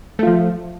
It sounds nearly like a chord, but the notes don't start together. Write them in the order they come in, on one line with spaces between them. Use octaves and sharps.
A3 F4 F3